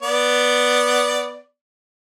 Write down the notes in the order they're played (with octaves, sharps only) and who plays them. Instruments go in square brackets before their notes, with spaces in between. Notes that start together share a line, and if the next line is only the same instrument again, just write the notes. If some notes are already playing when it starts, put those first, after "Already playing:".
[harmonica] B3 D5